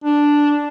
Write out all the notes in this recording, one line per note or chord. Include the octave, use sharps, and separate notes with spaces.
D4